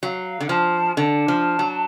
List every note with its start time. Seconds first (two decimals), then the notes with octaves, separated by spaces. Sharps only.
0.03 F#3 F5
0.41 D3
0.49 F3 A5
0.96 D3 A5
1.28 F3
1.59 F#3